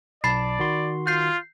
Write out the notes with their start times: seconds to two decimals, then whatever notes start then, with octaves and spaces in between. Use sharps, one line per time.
0.24 B1 D5 A5 B5 A6 C7
0.59 D#3 F#4 C6
1.07 F4 G6 C7